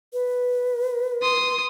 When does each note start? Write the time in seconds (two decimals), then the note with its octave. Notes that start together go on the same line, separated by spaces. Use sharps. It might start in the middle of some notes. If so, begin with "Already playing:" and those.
0.13 B4
1.22 C6 D#6